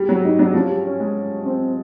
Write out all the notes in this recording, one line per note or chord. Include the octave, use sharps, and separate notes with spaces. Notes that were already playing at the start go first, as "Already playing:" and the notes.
Already playing: G3
F#3
G3 D#4
F#3 D4
F3 C#4
G3
C#4
G#3
C4